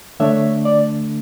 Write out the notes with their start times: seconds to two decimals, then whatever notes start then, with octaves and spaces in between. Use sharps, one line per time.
0.20 D3 A3 D4 C#5 E5
0.65 D5